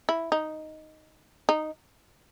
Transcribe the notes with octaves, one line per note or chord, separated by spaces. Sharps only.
E4
D#4
D#4